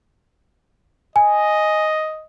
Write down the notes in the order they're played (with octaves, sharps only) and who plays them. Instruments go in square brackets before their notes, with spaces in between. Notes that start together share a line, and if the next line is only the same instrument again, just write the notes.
[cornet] D#5 [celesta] G#5